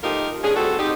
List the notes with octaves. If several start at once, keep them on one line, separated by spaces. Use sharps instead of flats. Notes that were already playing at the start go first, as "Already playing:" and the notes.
F3 A3 D#4 F4 G4 A#4
F3 C#4 D4 G#4
G3 A3 C4 F#4 A4
C4 D#4 G4